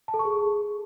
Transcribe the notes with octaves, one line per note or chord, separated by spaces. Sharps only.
A5
A4
C#6
G#4